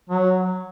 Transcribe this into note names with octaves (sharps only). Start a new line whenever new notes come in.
F#3